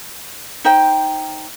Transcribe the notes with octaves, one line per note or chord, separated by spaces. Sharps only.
D#4 C5 G5